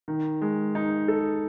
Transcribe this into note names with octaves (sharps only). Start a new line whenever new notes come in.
D#3
G#3
D#4
A4